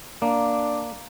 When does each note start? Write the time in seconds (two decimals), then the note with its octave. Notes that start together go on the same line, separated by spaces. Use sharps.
0.22 A#3 D4